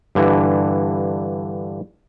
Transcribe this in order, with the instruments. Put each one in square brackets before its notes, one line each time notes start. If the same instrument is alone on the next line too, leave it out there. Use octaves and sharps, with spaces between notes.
[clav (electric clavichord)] G2 D3 E3